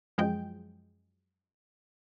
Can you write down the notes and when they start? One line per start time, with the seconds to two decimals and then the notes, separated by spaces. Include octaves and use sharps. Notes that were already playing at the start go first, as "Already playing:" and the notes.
0.18 F#2 F3 G#3 G5